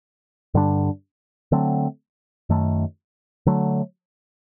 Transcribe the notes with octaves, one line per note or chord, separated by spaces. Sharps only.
G2 D3 G3 D4
D3 F#3 A3 C4
F#2 D#3 A3
D3 F#3 A3